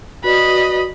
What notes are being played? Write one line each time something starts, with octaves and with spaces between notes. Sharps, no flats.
F#4 B4 D5 D#5 B5